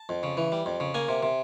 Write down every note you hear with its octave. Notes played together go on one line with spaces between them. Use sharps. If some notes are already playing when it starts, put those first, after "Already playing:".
Already playing: A5
F2
C#3
E3
G3
F2
C#3
A#3 G#5
C3
C3